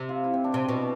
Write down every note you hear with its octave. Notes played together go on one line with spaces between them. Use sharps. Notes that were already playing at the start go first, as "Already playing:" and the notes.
Already playing: C3
F4
E4
C4
D4
C3 C4
B2